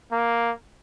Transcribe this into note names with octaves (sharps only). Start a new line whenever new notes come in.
A#3